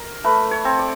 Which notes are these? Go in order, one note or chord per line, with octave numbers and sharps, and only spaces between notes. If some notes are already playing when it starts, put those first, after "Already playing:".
Already playing: A#4
A3 B4
C#5
C4
D5